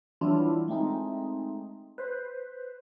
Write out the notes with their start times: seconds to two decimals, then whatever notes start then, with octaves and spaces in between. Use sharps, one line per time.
0.21 E3 F#3 G3 D4 E4 F4
0.68 G#3 A3 C4 D#4
1.98 B4 C5